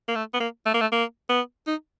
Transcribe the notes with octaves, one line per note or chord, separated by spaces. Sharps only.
A#3
A3
B3
A#3
A3
A#3
A3
A#3
B3
D#4